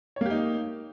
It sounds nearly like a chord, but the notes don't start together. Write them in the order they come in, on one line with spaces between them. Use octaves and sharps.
C#5 A#3 G4 D#4